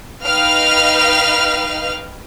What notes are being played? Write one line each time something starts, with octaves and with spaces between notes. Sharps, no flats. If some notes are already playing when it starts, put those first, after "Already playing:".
D#4 B4 F5 G5 F6